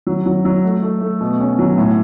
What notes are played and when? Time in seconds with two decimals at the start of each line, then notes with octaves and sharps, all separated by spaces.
0.07 F#3
0.26 F#3
0.45 F#3
0.64 A3
0.83 A3
1.01 A3
1.21 B2
1.40 C#4
1.59 F#3
1.78 A2